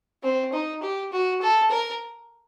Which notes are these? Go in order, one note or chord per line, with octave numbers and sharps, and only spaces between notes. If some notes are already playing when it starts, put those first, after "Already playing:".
C4
D#4
G4
F#4
A4
A#4